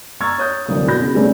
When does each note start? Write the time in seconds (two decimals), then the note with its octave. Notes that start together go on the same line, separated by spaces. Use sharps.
0.20 A#5 C#6 E6 F6 G#6 A6
0.38 C#5 D#6 G6
0.66 D1 C2 D#6
0.87 B2 F#4 B5 G6 A#6
1.01 C#3
1.14 C#3 G3 A3 C4 C#4